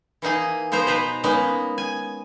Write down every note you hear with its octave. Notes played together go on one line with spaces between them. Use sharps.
E3 A#3 D#4 G#4
F3 B3 D#4 C5 A#5
B2 B3 D#4 B4 C5 A#5
G#3 A#3 B3 C#4 D#4
G#5